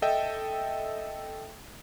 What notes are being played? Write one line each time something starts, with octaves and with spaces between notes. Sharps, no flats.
A4 D#5 E5 G5